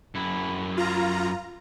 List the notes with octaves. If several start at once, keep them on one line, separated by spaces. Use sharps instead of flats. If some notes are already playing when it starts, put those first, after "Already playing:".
F#2 E4
F4 A#5